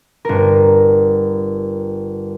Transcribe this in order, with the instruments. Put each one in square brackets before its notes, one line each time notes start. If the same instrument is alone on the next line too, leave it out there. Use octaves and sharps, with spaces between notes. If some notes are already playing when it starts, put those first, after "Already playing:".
[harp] G1 A#4